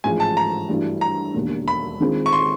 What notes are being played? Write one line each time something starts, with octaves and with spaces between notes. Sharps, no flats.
A1 G#2 F3 G#3 G#5
A5
A#5
G2 E3 A3 D4 F#4
A#5
E1 D#2 D3
B5
D#3 G#3 C4 F4
C#6
C6